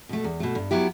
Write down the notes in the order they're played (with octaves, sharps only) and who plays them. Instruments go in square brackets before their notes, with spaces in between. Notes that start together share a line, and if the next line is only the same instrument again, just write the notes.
[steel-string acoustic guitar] B2 A3
E2
B2 A3
G2
F#3 B3 E4 G4